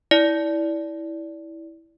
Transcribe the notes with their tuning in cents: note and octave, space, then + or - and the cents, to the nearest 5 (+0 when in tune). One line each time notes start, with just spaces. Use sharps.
E4 -15 D5 -15